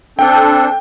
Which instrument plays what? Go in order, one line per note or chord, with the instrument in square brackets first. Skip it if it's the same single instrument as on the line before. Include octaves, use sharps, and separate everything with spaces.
[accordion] C4 D4 A4 [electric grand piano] G5